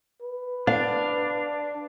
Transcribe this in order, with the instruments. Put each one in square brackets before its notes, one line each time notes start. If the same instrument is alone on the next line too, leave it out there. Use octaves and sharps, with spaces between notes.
[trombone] B4
[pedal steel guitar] D4 [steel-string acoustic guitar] F5